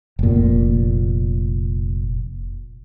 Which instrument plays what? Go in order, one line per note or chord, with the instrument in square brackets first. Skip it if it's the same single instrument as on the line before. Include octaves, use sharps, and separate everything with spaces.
[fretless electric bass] F1 A#2